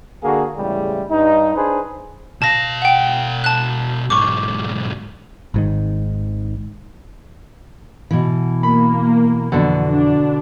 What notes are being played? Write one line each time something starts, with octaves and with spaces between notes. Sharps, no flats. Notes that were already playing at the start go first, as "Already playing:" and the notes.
D3 A#3 F#4 G#4
E2 A2 C#3 G3 G#3
G2 D#4
D4 D#4 G#4 B4 C5
B2 F5 A5 A#6
F#5 G5
A5 F#6
B1 G#2 C#6 D6
G#1 G#2 D#3
B2 E3
A#3 B5
F2 B2 D3 E3
D4